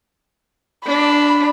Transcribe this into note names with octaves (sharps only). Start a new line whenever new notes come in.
D4 B5